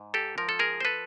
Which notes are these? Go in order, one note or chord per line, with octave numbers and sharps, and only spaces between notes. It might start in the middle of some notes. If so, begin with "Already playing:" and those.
Already playing: G#2
G4 A4
F3 A#4
A4
G#4 A#4
C5
A4 B4